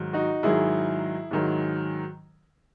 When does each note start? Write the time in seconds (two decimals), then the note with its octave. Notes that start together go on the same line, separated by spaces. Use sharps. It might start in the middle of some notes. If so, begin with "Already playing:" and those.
Already playing: G#2 D#3 F#3
0.13 D#4 F#4
0.43 G#2 D#3 F#3 E4 G#4
1.31 G#2 D#3 F#3